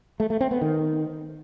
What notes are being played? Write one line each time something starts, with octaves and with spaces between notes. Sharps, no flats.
A3
A3
C4
B3
D#3